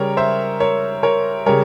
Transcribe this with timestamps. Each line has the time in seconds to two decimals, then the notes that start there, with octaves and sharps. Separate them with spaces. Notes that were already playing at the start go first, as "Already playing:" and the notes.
Already playing: C#3 G3 A#4 C#5
0.17 C5 E5
0.60 A#4 C#5
1.03 A#4 C#5
1.46 C#3 G3 A#4 C#5